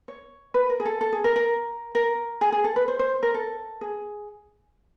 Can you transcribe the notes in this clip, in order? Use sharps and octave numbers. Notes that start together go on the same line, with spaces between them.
C#5
B4
A#4
G#4
A4
A4
G#4
A#4
A#4
A#4
G#4
G#4
A4
B4
C5
C5
A#4
A4
G#4